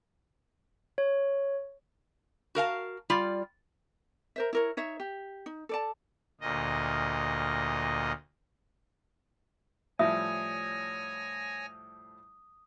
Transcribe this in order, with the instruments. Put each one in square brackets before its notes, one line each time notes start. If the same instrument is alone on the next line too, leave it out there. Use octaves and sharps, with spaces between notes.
[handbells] C#5
[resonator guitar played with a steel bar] F#4 A#4 F5 A5
G3 F4 D5
[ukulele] A#4 C5 E5
E4 A#4 C#5
D#4 C#5 E5
G4
D#4
A4 D5 A5
[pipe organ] D2 A#2 D#5
[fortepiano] A2 F3 G3 [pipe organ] C#5 G#5 A#6 [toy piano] E5 [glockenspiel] D#6